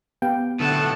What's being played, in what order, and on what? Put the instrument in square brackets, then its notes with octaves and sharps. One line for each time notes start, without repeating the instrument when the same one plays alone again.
[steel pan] B3 G4 F5 [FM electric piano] G5
[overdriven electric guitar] B1 A2 [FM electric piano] D3 [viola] F#5 A5